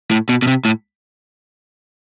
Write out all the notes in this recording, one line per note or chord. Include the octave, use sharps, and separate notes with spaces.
A2
B2
B2
C3
A2